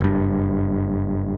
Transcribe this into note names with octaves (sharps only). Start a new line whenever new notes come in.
F#1 G2